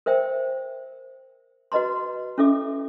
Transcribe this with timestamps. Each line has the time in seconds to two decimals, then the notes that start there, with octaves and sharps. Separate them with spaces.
0.06 A#4 C5 E5 G5
1.72 F#4 B4 D#5 A#5 C6
2.38 C#4 E4 A4 E5 D6